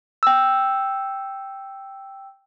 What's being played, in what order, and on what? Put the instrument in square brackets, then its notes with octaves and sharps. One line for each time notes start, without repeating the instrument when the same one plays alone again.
[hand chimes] G5 E6